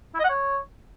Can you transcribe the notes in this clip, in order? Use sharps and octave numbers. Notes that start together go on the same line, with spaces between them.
E4
D#5
F#5
C#5